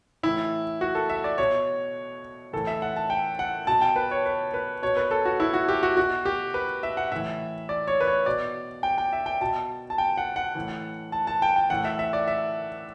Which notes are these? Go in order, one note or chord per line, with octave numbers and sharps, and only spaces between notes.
A2 E3 E4
F#4
A4
E5
D5
B2 C#5
A2 E3 A4
E5
F#5
A5
G5
F#5
B2 A5
G5
B4
C#5
B4
B4
B2 C#5
B4
A4
F#4
E4
F#4
G4
F#4
B2 F#4
G4
B4
E5
F#5
A2 E3 E5
D5
C#5
B4
C#5
B2 D5
G5
G5
E5
G5
B2 A5
A5
G5
F#5
F#5
A2 E3
A5
A5
G5
G5
A2 E3 F#5
E5
E5
D5
E5